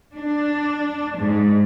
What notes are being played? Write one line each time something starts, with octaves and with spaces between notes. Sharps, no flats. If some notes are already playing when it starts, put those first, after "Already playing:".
D4
G#2